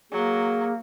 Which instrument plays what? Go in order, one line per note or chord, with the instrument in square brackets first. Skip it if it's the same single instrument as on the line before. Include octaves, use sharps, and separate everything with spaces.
[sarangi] F#3 [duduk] A#3 [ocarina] G#4